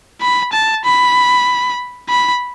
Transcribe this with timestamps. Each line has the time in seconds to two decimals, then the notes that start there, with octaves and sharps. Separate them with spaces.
0.22 B5
0.53 A5
0.85 B5
2.09 B5